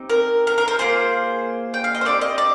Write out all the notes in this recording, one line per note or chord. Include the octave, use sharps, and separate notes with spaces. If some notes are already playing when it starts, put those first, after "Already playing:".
Already playing: C4 D#4 G4
A#4
A#4
A#4
C5
A#3 F4 G#4 C5
G5
F5
D#5
C5
C4 D#4 G4 D5
D#5
D5